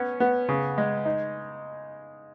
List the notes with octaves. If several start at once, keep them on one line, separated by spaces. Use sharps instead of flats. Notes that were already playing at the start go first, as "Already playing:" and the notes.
Already playing: B3 C#4
B3
C#3
G#3
D#4